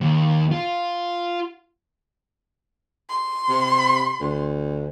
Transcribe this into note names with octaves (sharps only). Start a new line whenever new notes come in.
D#2
F4
C6
C3
D2